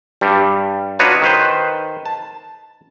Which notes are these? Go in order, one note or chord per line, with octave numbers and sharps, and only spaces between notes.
G2 G3
D4 D#4 F4 F#4 B4 C#5
D#3 B4 C5
A5